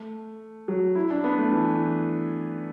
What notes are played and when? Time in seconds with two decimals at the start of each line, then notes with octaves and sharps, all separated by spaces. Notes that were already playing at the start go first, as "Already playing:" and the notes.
Already playing: A3
0.68 F#3
0.95 E4
1.10 D4
1.24 B3
1.38 A3
1.52 E3